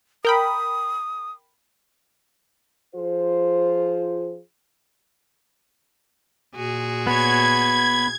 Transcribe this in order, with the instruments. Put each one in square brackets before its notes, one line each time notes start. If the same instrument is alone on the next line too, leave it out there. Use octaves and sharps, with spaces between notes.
[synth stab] A#4 G5 B5 [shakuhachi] D#6
[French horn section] F3 F4 G#4 C5
[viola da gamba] A#2 F#4 G#4
[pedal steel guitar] B3 C#5 [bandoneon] B5 [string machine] G#6